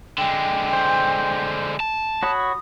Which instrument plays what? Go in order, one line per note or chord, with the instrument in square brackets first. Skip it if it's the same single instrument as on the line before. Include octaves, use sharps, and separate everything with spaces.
[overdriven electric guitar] D3 G#3 [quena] G5
[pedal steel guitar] C5
[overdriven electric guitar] A5
[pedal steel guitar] F#4 C#5 B5 [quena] D#6